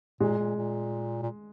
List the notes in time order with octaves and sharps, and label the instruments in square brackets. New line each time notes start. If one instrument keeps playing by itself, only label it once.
[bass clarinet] A#2 [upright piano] G#3
[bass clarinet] A#2
A#2
A#2